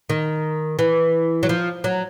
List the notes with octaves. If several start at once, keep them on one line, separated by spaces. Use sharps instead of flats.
D#3
E3
F#3
F3
F#3